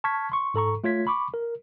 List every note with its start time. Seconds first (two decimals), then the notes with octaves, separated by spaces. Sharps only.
0.04 A5 C#6 F6 G#6 B6
0.32 C6 C#6
0.54 G#2 A4 A#5 C#6
0.84 A3 F4 C#5 G#6 B6
1.07 B5 C#6 D6
1.34 A#4